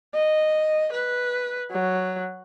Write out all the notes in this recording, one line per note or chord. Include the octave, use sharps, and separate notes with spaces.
D#5
B4
F#3